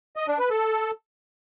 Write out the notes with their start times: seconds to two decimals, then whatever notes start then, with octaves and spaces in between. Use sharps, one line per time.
0.16 D#5
0.28 D4
0.39 B4
0.50 A4